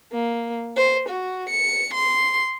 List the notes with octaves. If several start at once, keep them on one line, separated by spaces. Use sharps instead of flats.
A#3
C5
F#4
C#7
C6